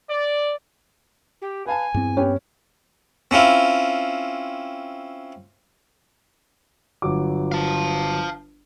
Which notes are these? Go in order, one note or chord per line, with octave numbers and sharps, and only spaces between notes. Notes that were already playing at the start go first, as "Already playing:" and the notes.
D5
G4
B4 F5 G#5 A5
E2 G2 C4
B3 C#4 G4
C4 C#4 E4 F4
G1 F#3 D6
F5 A5